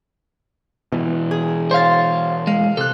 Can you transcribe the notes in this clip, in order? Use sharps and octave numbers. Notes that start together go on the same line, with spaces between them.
B2 E3
G#4
C5 C#5 F5 C6 A6
G#3 F5
C3 A4 F#6